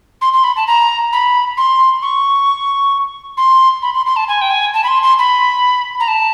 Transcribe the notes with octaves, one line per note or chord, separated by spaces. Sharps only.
C6
C6
B5
A5
A#5
B5
C6
C#6
C6
B5
C6
C6
A5
G#5
G5
G#5
A5
B5
C6
C6
B5
A#5
A5